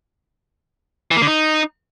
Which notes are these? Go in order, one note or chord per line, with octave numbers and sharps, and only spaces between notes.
E3
A#3
D3
D#4